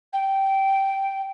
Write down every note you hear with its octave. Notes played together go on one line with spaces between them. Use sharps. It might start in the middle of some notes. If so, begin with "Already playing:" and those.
G5